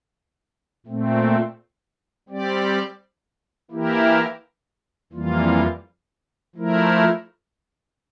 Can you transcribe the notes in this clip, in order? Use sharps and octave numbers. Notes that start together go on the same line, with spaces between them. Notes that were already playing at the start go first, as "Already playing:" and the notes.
A#2 A3 C4
G3 C4 G4 D5
E3 A#3 E4 G4 A#4
F2 E3 G3 A#3 F4
F3 A3 E4 A#4